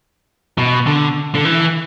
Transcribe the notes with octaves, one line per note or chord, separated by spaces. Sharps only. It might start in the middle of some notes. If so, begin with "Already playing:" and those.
B2
D3
D3
E3